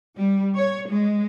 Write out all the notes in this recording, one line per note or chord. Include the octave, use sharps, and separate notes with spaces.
G3
C#5
G#3